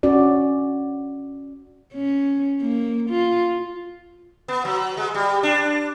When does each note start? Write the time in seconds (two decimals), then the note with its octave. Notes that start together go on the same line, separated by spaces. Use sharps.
0.03 C#4 F#4 D5
1.94 C#4
2.61 A#3
3.10 F4
4.48 B3
4.65 F#3
4.97 G#3
5.15 G3
5.43 D4